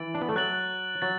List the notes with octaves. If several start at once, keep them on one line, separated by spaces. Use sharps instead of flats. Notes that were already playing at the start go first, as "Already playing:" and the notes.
Already playing: E3 A6 D7 F#7
D4
B3
A3
F#3 F#6 A6 F#7
F#3 A6